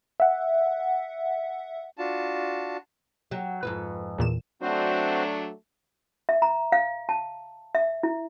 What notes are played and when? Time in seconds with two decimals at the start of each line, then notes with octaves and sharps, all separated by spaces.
0.20 E5 F#5
1.98 D4 F4 F#4 A5
3.31 F#3 G4
3.63 F2 G#2 B4
4.18 E2 A#2 E7
4.62 F#3 A3 C4 D4 F#4 C5
6.29 E5
6.42 A#5
6.72 F5
7.09 A5
7.75 E5
8.03 E4